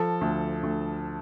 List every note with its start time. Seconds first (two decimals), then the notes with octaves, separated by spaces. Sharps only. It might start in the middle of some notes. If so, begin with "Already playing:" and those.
Already playing: F3 A4
0.21 D2
0.63 D2